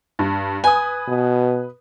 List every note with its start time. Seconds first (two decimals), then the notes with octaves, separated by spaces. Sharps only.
0.19 G2
0.64 B4 G#5 D#6
1.08 B2